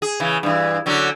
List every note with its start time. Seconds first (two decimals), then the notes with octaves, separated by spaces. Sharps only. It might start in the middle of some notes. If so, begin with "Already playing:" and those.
0.02 G#4
0.20 C#3 E3
0.43 G2 E3
0.86 D3 F#3 C#4